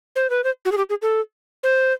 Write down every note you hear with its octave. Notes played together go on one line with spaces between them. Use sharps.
C5
B4
C5
F#4
G#4
G4
G#4
A4
C5